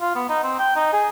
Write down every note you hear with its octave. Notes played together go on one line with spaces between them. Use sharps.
F4
B3
D#4
C4
G5
D#4
G#4